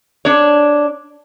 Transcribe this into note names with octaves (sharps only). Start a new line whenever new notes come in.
D4 C#5